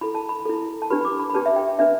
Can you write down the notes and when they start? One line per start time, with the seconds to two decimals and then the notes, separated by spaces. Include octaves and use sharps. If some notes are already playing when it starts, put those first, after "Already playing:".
0.01 E4 A4 B5
0.15 A5
0.29 B5
0.45 E4 A4
0.82 A5
0.90 D4 G4 B4 B5
1.01 B5
1.05 D6
1.19 B5
1.30 B5
1.34 D4 G4 B4 A5
1.46 E5
1.56 G5
1.79 D4 B4 E5